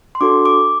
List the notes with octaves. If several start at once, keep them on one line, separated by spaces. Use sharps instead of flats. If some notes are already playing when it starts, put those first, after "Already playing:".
C6
D4 F#4 A4 D6
D6